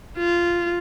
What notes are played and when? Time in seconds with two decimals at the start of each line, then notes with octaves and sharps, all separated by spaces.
0.18 F4